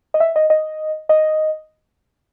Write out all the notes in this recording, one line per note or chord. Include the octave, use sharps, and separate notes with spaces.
D#5
E5
D#5
D#5
D#5